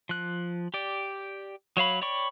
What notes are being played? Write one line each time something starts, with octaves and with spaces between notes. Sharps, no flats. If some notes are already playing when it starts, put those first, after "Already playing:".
F3 F#6
G4 D5
F#3 C#5 F5 B5
C#5 D5 G5 B5 C#6